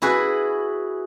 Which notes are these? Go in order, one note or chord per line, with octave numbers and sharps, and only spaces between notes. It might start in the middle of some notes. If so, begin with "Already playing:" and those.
E4 F#4 G#4 B4